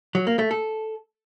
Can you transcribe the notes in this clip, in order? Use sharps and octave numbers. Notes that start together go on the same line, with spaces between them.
F#3
A#3
A3
A4